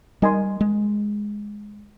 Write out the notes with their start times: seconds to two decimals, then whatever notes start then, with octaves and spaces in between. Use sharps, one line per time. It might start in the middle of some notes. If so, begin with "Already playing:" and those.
0.22 G3 D#4 A#4 D#5 G#5 C6
0.61 G#3